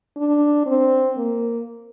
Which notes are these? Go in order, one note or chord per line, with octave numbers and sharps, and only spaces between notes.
D4
C4
A#3